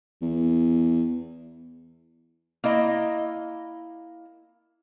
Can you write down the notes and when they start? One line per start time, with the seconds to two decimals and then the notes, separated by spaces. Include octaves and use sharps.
0.22 E2
2.64 A#3 E4 D#5